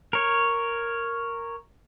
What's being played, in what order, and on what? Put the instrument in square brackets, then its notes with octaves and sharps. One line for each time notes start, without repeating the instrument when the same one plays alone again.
[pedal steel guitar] A#4 C#5